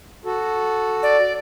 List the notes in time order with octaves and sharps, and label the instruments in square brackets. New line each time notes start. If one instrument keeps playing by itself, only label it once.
[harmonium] F#4 A4
[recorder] D5